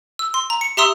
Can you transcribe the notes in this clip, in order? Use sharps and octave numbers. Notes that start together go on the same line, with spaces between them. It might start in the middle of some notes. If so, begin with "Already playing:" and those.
E6
C6
A#5
C#7
G4 E5 A#5 C6 D#6 E6